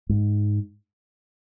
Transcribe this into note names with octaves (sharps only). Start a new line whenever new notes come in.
G#2